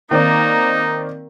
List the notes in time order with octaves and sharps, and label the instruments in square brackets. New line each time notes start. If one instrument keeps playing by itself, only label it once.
[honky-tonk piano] D#3 C4 D5 [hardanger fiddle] A#3 [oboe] D#4